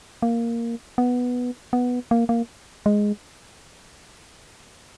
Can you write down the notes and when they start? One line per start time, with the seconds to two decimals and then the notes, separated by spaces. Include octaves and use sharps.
0.22 A#3
0.98 B3
1.73 B3
2.11 A#3
2.29 A#3
2.86 G#3